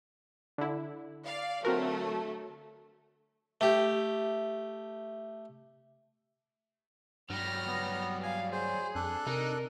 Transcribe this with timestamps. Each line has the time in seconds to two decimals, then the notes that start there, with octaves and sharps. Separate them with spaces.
0.58 D3 E4
1.26 D5 F5
1.65 D3 F#3 A3 C4 F#4 A#4
3.61 A3 G4
7.30 G2 F#3 G3 F6 A#6
7.67 B3
8.23 F5 G#5
8.52 G#4 C5
8.95 F2 D4 A4 F#6
9.26 C3 D#4 A#4